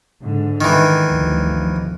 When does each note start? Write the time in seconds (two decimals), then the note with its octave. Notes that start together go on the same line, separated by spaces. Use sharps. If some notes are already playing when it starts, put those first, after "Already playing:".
0.20 G#2 D3
0.61 D#3 E3
1.05 G1 D2 F3